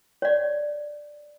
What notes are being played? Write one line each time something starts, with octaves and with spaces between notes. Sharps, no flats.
C#5 D5